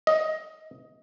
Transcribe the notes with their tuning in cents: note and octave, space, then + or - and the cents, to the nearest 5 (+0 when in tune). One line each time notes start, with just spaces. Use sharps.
D#5 +15